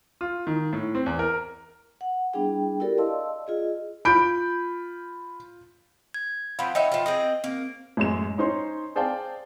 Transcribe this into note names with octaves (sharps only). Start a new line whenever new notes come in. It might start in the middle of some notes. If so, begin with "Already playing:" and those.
F4
D#3
A2
C4
E2
A#4
F#5
G3 B3 D4 E4 G#4 G5
E4 F#4 G4 A4 A#4 D5
D5 D#5 F5 A5 C6 E6
F4 G#4 D#5
F4 B5 G6 D7
G#6
F3 C4 F5 F#5 B5
D#4 C#5 E5 G5
F3 F4
C4 G#4 D#5
A#3 C4
A1 F#2 G#3 E7
C#4 D#4 C5 C#5 C6
G#4 C5 D5 F5 G5 A5